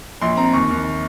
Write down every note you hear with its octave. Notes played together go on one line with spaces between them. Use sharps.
A#1 C6
C4 A#5
D#2 C#6
D#2